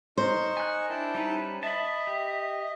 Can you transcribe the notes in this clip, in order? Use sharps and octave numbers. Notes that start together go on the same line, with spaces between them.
D#4 A#4 C5 C#6
G#5 F#6
D4 E4 G5 A5
G3 C#4 D#4 B4
D#5 E5 A5 B5
G4